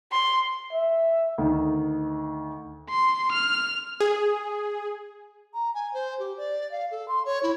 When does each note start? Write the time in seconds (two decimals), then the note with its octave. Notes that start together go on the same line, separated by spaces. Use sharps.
0.12 C6
0.72 E5
1.38 D2 D#3
2.90 C6
3.32 F6
4.00 G#4
5.54 A#5
5.74 G#5
5.94 C5
6.19 G4
6.38 D5
6.72 F5
6.91 A4
7.08 C6
7.26 C#5
7.43 E4